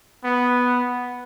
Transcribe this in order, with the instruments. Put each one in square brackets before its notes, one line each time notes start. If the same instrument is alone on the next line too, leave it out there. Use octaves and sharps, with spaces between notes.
[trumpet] B3